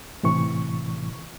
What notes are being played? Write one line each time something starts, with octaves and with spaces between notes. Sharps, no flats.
A2 C3 E3 C#6